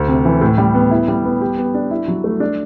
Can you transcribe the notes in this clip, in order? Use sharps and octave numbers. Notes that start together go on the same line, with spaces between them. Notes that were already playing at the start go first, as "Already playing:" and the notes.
Already playing: D2
C3
E3
A2
G3
B3
E4
G3
B3
G4
B3
D4
E4
F#3
A3
D4